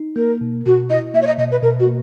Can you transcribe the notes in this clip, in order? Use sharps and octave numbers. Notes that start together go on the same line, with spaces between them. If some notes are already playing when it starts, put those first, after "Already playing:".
Already playing: D#4
A#3 A#4
B2
B2 F#4
E4 D#5
A#3 E5
C#5
D#5
B2 D#5
B4
B2 A#4
F#4
A#3